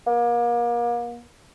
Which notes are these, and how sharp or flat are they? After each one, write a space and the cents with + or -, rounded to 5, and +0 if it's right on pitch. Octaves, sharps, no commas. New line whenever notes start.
A#3 +35